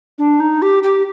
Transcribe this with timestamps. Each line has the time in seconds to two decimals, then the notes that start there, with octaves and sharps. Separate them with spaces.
0.18 D4
0.40 D#4
0.62 G4
0.83 G4